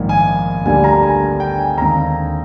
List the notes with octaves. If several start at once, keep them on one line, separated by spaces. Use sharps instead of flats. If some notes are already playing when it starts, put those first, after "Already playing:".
Already playing: A#1 G#2 D#3 A#3
G#5
D2 D3 G3 A#3 G#5
A#5
G#5
G5
G#5
D#2 D3 G#3 C4 A#5